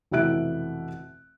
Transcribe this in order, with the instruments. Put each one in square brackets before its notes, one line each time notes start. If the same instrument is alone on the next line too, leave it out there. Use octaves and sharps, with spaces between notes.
[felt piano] F1 B2 E3 E5 F#6 D7